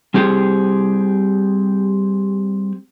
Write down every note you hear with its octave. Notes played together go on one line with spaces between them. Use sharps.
G3 C4 G4 G#4